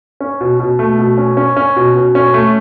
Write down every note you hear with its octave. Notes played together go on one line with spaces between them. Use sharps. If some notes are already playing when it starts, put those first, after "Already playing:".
C#4
B2
B2
A3
B2
C#4
C#4
C#4
B2
B2
C#4
A3